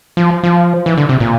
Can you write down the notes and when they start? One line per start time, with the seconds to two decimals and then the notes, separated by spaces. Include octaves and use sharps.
0.17 F3
0.43 F3
0.86 E3
0.98 D3
1.09 C3
1.20 A#2